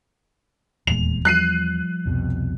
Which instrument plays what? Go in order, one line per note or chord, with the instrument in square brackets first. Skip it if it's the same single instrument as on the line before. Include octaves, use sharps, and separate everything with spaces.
[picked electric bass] D#1 A#2 G#3 [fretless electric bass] E2 [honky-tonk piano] F7
[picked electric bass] F3 G3 [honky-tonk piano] F#6 C7 D#7
[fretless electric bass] C2 F2 B2